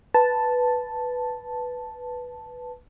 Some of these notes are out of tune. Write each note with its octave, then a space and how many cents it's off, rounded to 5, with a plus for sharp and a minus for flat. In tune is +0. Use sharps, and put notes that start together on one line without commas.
B4 +0 A5 +0